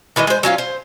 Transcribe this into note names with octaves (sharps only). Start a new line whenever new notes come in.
D#3 E3 G#3 D#5
G#3 C5
F#3 C#4 F4 F5
C5